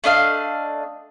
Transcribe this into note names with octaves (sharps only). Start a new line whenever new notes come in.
A3 D4 D#5 F5